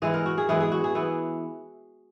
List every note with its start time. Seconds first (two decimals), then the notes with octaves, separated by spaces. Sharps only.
0.02 E3 G#3 B3 E4 D#5
0.14 A#4
0.26 F#4
0.38 G#4
0.49 E3 G#3 B3 E4 G#4
0.60 G#4
0.72 F#4
0.84 G#4
0.95 E3 B3 E4